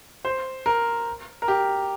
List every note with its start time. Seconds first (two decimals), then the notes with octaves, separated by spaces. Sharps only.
0.25 C5
0.66 A#4
1.42 A#4
1.48 G4